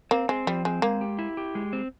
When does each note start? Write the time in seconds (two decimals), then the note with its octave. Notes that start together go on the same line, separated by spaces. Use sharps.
0.11 A#3 C4
0.29 G#3 C4
0.47 F3 G3
0.65 G#3 C4
0.82 G#3 A#3
1.01 G4
1.19 E4
1.37 G4
1.55 G#3
1.73 C4